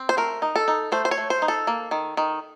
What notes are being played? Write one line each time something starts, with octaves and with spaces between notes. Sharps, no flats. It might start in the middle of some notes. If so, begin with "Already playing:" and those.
Already playing: C4
C5
A3 A#4
D#4
A4
D#4
A3 C5
C5
C#5
A3
C5
D#4
A4
A#3
D#3
D#3